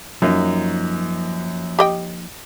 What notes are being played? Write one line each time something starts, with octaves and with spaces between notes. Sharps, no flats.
F#2 F3 A#3 D#4
G4 D#5 G5